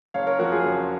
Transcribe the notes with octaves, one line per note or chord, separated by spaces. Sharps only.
F#1 C#5 F5
A#4 C#5
F2 F3 F#4 A#4
F4 G#4
F#1